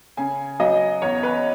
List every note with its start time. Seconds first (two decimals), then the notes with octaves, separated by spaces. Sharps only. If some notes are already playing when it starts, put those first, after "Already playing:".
0.17 C#3 G#5
0.60 F#3 D#5
1.02 E2 C#5
1.23 B4